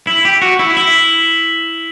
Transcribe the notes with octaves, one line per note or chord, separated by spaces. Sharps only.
E4
G4
F#4
E4
E4